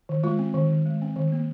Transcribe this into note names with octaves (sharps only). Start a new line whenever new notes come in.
D#3
G#3 F4
C4
D#3
D#3
G#3
C4
D#3
A#3